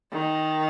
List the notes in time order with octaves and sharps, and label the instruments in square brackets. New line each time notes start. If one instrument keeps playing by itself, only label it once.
[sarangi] D#3